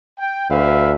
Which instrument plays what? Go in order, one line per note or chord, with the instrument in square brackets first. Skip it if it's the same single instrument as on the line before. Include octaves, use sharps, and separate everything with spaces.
[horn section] G5
[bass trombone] D2 [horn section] B4 E5 F5